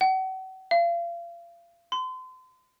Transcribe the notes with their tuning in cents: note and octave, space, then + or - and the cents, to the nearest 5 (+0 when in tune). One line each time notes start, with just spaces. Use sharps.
F#5 +40
F5 -35
C6 -35